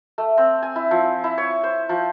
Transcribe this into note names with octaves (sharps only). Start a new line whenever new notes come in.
A3
C4
G#5
E4
F3
E4
C#5
C5
F3